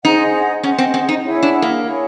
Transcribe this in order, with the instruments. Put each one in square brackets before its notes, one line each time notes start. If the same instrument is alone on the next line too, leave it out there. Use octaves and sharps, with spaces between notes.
[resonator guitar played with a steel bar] D#4 [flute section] G#4 C5 D#5 F#5
[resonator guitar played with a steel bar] C#4 [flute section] G#4 C5 D#5 F#5
[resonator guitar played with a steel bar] C4
C4
D#4
[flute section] E4 G#4 C#5 F#5
[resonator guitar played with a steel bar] D4
A#3
[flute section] E4 G#4 C#5 F#5